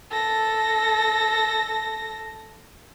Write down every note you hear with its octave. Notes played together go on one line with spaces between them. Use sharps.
A4 A#6